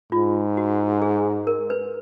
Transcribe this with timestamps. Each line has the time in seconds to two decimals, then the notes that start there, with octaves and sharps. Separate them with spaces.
0.12 G#2 F4
0.57 F#4
1.02 G#4
1.47 A#4
1.70 B4